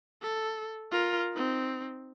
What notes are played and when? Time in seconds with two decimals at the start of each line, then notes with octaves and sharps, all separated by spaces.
0.22 A4
0.92 F4 A#4
1.33 C4 D#4